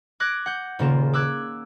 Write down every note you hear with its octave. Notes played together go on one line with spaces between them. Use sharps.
D6 F#6 G#6 A#6 D7
F#5 G6
D#1 C#3 A#3 F4 E7
D6 E6 F#6 G#6